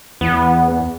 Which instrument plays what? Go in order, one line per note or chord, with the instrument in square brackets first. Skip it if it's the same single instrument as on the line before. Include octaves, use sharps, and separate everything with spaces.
[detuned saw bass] E2 [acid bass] B3